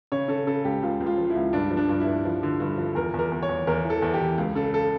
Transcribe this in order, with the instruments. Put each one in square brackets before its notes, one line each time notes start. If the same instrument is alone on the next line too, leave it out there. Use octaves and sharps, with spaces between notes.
[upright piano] C#3 C#5
C#3 A4
C#3 A4
C#2 G4
C#2 F4
C#2
F4
F3
E4
C#2
G2 D4
F3
D4
G2
E4
G2
F3
D3
G2
F3
E2 A#4
E2
A#4
E2
C#5
E2
E2 A#4
E3 A4
E2
G4
E3
C#2
C#3 A4
A4